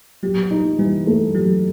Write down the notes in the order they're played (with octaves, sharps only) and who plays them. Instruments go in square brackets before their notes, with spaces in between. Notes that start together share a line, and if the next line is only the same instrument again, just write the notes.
[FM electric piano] F#3 [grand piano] G4
[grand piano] D#4
[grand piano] E3 [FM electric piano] G3
[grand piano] A3
[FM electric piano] F#3 [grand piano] G4